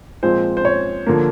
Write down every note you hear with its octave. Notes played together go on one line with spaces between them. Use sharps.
A#2 F3 G#3 C4 C5
C5
C#5
D3 F3 A#3